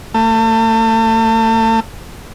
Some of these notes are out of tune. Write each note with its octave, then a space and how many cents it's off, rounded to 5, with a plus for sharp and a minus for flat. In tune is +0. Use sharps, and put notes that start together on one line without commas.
A3 +35